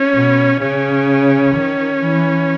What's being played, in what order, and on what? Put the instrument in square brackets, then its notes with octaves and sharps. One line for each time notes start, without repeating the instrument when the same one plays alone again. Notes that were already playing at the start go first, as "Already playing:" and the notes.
Already playing: [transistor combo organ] C#4
[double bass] B2
[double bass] C#3 [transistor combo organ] C#4
[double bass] D#3
E3